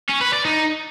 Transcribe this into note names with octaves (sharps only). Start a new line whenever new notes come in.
C#4
B4
D5
D#4